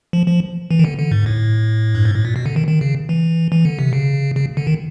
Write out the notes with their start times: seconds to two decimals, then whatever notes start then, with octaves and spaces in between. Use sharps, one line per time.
0.13 F3
0.27 F3
0.71 E3
0.79 D#3
0.85 D3
0.99 D3
1.12 G#2
1.26 A2
1.95 G2
2.05 G#2
2.15 A2
2.25 A#2
2.36 B2
2.46 D3
2.56 D#3
2.67 D#3
2.81 C#3
3.09 E3
3.52 E3
3.65 D3
3.79 C3
3.93 C#3
4.36 C#3
4.57 D3
4.67 D#3